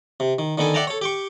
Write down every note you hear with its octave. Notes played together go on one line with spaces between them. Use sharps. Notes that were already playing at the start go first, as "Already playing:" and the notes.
C3
D#3
D3 D#3 B3 A4 G#5
D5 E5 F#5 G5 A5 A#5
A4 C#5
G4 G5 C#6